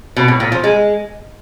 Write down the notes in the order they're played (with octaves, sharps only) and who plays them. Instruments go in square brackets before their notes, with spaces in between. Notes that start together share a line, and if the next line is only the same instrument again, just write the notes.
[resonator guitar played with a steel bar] B2
A2
A#2
F3
G#3